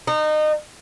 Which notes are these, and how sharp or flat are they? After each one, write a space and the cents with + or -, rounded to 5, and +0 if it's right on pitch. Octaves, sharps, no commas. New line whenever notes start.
D#4 -25